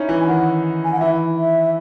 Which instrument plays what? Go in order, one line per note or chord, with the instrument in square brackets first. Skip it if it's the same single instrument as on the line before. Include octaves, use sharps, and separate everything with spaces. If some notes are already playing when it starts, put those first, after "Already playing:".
Already playing: [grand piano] C#4 D#4 E4
E3
[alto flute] G#5
[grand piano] D#3 [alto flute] F#5
[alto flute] G#5
F#5
[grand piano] E3 [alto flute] E5
[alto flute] E5